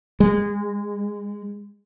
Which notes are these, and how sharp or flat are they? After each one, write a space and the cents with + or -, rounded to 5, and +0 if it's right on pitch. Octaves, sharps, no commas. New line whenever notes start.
G#3 -25